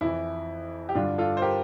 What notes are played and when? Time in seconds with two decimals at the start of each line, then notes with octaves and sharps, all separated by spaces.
0.01 F2 E3 E4
0.89 G4
0.95 G2 D3 D4 F4
1.18 F4 A4
1.37 C5
1.42 G4 A#4